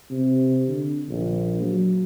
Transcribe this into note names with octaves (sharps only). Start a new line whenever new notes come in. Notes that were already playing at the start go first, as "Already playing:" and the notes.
C3
D3
A#1
F#3